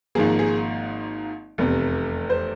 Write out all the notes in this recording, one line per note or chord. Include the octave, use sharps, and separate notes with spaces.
G#1 G#2 F3 A#3 G#4
G#4
F1 E2 C3
C5